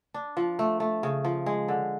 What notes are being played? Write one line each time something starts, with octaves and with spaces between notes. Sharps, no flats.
D4
F3
A3
A3
C#3
F3
G#3
D3